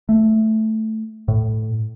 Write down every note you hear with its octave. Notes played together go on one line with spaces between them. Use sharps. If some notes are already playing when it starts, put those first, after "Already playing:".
A3
A2